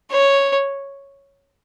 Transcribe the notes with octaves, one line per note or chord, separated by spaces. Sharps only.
C#5